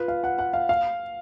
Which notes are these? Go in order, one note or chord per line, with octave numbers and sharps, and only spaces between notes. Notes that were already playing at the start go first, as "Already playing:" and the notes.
Already playing: F4 B4
F5
F#5
F#5
F5
F5